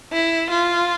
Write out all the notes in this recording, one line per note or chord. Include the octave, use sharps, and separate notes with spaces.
E4
F4